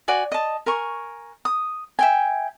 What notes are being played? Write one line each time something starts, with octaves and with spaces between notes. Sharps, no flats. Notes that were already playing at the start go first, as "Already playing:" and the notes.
F#4 D5 G#5
D#5 A5
A#4 G#5 C#6
D#6
E5 G5 G#5